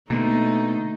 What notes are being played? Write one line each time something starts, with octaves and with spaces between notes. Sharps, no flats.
B2 D3 A3 A#3 D#4